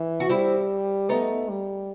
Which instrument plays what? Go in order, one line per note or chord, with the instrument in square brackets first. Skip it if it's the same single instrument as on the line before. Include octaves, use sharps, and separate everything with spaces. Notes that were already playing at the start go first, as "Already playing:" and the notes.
Already playing: [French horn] E3
[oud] F#4
[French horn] G3 [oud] C4 E4
[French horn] A3 [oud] B3 D#4
[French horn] G3